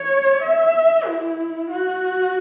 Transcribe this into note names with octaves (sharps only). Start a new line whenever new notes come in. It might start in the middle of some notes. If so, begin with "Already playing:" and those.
Already playing: C#5
E5
E4
F#4